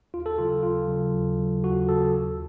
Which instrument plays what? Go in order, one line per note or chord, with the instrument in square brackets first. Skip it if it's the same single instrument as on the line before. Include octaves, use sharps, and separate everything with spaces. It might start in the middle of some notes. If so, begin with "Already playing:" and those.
[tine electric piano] D#2 F4
A4
C#3 F#3 F4
D#2 F4
C#3 F#3
D#2
C#3 F#3
D#2 F#4
C#3 F#3 A4
D#2